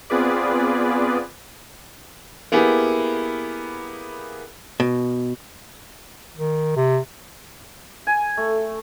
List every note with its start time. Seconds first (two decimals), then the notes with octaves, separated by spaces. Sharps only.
0.10 B3 C4 F4 G#4 B4 D5
2.52 A#3 B3 E4 G4 G#4
4.80 B2
6.38 D#3
6.77 C3
8.07 G#5
8.37 A3